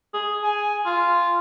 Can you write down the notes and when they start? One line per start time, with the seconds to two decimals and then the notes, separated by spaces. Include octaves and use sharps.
0.14 G#4
0.44 G#5
0.86 F4